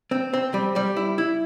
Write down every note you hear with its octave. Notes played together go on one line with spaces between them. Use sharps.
C4
C4
G3
G3
E4
E4